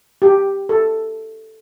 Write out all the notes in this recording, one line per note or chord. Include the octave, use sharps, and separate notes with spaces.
G4
A4